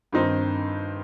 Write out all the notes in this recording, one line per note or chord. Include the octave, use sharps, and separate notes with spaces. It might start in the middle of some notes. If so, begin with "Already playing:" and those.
G2 D#3 C4 D#4 C5